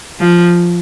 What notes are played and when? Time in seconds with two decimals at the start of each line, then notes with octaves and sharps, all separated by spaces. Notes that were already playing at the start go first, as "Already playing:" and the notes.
0.20 F3